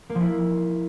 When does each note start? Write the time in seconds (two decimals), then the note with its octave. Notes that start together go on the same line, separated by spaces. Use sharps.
0.10 A#3
0.15 F3
0.21 E4